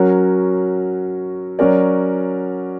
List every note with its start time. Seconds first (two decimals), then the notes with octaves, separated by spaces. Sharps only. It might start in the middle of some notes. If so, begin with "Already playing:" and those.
Already playing: F#3 C#4 F#4 A#4
1.59 F#3 C#4 F#4 A#4 D5